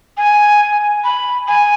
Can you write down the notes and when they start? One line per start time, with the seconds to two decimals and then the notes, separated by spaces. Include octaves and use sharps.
0.17 G#5
1.04 B5
1.48 G#5